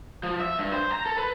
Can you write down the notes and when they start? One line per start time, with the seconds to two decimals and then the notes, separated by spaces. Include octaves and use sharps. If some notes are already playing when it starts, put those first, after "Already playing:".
0.23 F3
0.40 E5
0.58 G2
0.73 C5
0.92 A#5
1.06 A4
1.18 B4